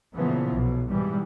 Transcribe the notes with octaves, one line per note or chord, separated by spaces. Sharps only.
A#2 C#3 E3 F3 B3
B1 B2
G#2 B2 E3 G3